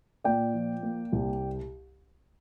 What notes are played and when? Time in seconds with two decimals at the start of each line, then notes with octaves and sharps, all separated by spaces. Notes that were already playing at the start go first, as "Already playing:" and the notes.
0.24 A#2 D5 G5
0.54 F3
0.83 A#3
1.12 C2